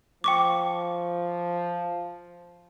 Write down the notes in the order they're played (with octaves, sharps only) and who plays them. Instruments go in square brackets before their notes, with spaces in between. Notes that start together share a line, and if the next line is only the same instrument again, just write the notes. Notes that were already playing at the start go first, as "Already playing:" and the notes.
[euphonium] F3 [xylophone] G5 C#6 D6